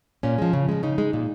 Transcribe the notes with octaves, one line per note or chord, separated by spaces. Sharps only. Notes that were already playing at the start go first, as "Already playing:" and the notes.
A#2 C#4
F3 G#3
C#3
F3 G#3
C#3 D#4
G#3
A#2